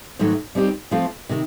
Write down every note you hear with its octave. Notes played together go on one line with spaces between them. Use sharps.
G#2 D#3 F#3 A3
G3 C4 D#4 G4
F3 A3 C4 F4
C3 D#3